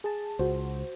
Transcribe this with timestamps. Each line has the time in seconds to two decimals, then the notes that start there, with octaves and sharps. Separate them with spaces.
0.04 G#4 A5
0.39 C#2 F#4 C5